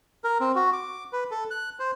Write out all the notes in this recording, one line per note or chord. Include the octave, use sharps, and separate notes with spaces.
A#4
C4
F#4
D6
B4
A4
F#6
C5